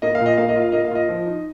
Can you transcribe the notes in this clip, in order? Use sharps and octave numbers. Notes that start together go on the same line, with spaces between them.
A#3 D#5
F5
A#2
D#5
A#3 F5
D#5
F4 F5
A#3 D#5
F5
F4 D#5
F3
D#4